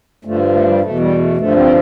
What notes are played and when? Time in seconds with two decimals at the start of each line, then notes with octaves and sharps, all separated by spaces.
0.25 G2 D3 F3 A3
0.53 A3
0.67 G3
0.81 E2 B2 A3
1.00 G3
1.18 A3
1.37 G2 D3 F3 A3
1.56 C4